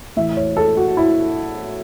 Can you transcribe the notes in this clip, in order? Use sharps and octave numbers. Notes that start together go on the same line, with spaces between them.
A2 E3 E5
C#5
A4
F#4
E4